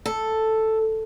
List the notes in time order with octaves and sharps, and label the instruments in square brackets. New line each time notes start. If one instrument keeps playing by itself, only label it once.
[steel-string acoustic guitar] A4